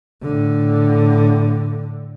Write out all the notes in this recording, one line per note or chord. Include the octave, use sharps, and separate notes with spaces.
A2 D3